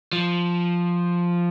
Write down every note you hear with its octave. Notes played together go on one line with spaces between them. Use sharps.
F3